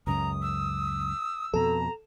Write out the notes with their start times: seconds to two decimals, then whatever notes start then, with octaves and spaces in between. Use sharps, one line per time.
0.07 C#2 F#2 C#3 A#5 D#6
0.42 E6
1.54 F2 B2 A4 A#5